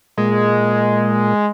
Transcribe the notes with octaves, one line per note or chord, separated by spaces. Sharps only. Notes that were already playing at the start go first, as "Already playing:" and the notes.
A#2 G#3